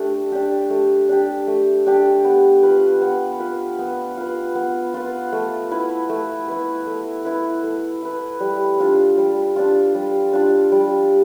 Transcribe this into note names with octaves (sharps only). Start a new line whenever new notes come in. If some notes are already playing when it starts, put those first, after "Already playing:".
Already playing: A3 D4 G4
D4 G4
A3
D4 G4
A3
D4 G4
B3
F4 B4
B3
F4 B4
B3
F4 B4
B3
F4 B4
A3
E4 B4
A3
E4 B4
A3
E4 B4
A3
E4 B4
G3
D4 F4
G3
D4 F4
G3
D4 F4
G3